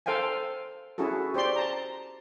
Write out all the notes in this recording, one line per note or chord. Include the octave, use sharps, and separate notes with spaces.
A4 C5 F5 G5 G#5
C#4 E4 F#4 G#4 A4
G4 C5 D5 C6
A5 A#5